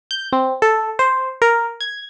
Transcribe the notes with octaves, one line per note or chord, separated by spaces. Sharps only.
G6
C4
A4
C5
A#4
G#6